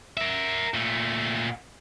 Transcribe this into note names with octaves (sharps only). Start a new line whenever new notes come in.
A#4 E5
A#2 A3